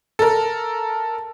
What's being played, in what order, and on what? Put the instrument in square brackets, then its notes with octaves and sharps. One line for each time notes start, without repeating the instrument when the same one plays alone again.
[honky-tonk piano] A4 A#4